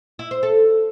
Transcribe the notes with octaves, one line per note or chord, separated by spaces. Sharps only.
E4
C5
A4